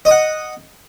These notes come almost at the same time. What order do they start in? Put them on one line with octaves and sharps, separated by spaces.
D#5 D#6 F#5